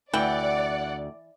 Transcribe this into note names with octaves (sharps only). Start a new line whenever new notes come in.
D2 E3 D5 F#5 G5